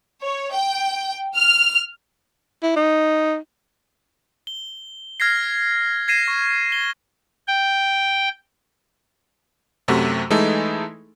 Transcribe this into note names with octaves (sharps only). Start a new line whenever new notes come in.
C#5
G5
F6
E4
D#4
G7
F6 G#6 A#6 C7
G#6 A#6 C7 D#7 E7
C#6
G7
G5
F#2 C3 A3 F#4
E3 G#3 A3 D#4 E4 A4